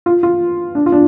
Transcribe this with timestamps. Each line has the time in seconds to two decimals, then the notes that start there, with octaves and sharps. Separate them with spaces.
0.06 F4
0.23 F4
0.75 D4
0.86 F4
0.92 D4